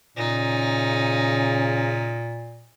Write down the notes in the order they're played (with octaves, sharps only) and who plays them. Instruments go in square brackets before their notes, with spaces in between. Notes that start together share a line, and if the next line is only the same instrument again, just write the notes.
[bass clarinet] A#2 [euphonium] C#3 [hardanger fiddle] D#4